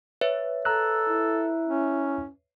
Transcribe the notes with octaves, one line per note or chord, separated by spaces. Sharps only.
B4 C#5 E5
A4 A#5 E6 F#6
E4
C#4